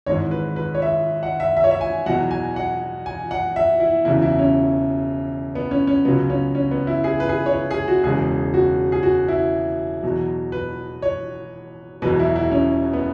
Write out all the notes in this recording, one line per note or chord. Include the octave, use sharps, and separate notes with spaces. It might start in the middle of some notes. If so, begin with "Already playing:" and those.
G#1 G#2 E3 G#3 C#5
B4
B4
C#5
E5
F#5
E5
E5
C#5
E5
G#5
E2 B2 F#3 F#5
G#5
F#5
G#5
F#5
E5
E4
E1 E2 C#3 E3 E4
E4
C#4
B3
C#4
C#4
C#2 C#3 F#3 B3
C#4
C#4
B3
E4
G#4
B4
G#4
C#5
B4
G#4
F#4
E1 E2 C#3 G#3 G#4
F#4
G#4
F#4
E4
E2 B2 F#3
B4
C#5
E1 E2 B2 F#3 B4
E4
E4
C#4
B3